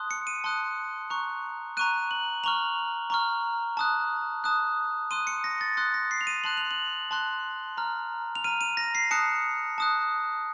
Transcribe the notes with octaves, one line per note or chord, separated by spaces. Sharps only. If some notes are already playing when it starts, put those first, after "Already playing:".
Already playing: A5 C6 D#6 F#6
C#7
D#7
A5 C6 D#6 F#6
A#5 C#6 F#6
A#5 C#6 F#6 D#7
F#7
A#5 C#6 F6 F7
A#5 C#6 F6
A5 D#6 F#6
A5 D#6 F#6
C6 D#6 F#6 D#7
C#7
A#6
A6
C6 D#6 F#6 A6
A#6
C7
F7
D#7
A5 C6 F#6 F#7
F7
F#7
A5 C6 F#6
A#5 F6
F7
A#5 F6 D#7
D#7
A#6
C7
A5 D#6 F#6 C#7
A5 D#6 F#6